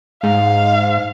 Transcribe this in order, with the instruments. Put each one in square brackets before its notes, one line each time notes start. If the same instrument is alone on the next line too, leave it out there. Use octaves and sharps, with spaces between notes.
[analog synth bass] G#2 [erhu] F5